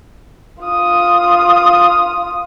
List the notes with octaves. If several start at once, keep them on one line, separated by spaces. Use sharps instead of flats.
F4 D#6